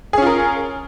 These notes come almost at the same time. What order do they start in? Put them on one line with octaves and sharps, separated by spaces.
G#4 C#4 F4 A#4